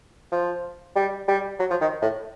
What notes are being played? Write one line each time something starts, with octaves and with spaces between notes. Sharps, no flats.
F3
G3
G3
F#3
F3
D#3
A2